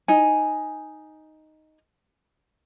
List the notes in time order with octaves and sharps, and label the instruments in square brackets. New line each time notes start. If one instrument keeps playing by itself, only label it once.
[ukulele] D#4 G#5